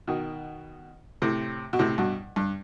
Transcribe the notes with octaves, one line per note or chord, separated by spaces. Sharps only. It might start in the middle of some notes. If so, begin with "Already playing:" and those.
B2 D#3
A2 C3
B2
A2 C3
G2 B2
G2